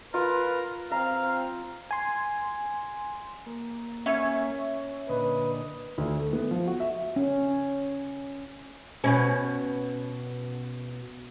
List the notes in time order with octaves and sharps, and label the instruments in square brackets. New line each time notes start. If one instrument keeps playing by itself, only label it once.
[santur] F4 [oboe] A#4 [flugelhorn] B4
[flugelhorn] C4 [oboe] F5 [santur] A#5
[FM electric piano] G#5 C6
[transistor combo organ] A#3
[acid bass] C#4 [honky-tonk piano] E5 C#6 G#6
[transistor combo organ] A#2 D3 D#5 [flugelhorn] B4
[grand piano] D2
A3
B3
F3
F#4
E5
[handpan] C#4
[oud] B2 C#4